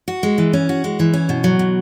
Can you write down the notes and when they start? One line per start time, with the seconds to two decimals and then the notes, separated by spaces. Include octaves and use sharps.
0.08 F#4
0.23 G#3
0.38 E3
0.53 C#4
0.69 F#4
0.84 G#3
1.00 E3
1.14 C#4
1.29 B2
1.44 F#3
1.59 B2